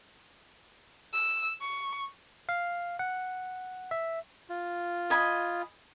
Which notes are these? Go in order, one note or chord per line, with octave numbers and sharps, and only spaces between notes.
E6
C#6
F5
F#5
E5
F4
D#5 G#5 B5